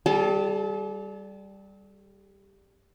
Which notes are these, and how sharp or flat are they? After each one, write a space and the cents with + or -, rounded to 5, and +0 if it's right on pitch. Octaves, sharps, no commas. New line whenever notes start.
G3 +0 A4 -45 A5 +0